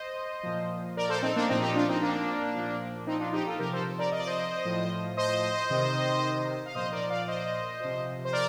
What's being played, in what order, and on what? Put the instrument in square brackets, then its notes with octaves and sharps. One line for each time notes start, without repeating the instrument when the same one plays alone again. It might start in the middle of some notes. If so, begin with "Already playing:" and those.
Already playing: [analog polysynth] C5 D#5
A#2 F3
A#4 D5
A4 C5
C4 D#4
A#3 D4
A#2 F3 C4 D#4
D#4 G4
D4 F4
C4 D#4
A#3 D4
A#2 F3
C4 D#4
D4 F4
D#4 G4
F4 A4
C3 F3 G4 A#4
A4 C5
A#4 D5
D#5
D5
C5 D#5
A2 F3
C5 D#5
C3 D#3
F5
A#2 F3 C5 D#5
A#4 D5
D5 F5
C5 D#5
C3 F3
C5
A#4 D5